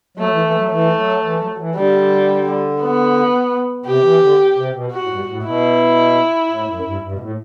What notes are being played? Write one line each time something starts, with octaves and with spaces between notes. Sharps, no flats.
F#3 A3
E3
E3
F#3
E3 A3
F#3
E3
F#3
F#3
E3
D3 G3
B3
C3 G4
E3
D3
C3
B2
F#4
A2
G2
A2
B2 E4
A2
F#2
G2
G2
B2
A2